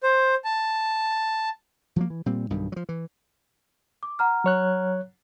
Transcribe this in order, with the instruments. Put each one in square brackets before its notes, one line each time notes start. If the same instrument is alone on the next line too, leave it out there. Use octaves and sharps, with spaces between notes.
[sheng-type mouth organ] C5
A5
[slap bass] F3 F#3 A#3
E3
A#2 G3 C4
B1 G2 B2 D#3
F3 F#3
E3
[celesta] D6
F#5 A#5 F6
[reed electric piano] F#3 C#5 F#6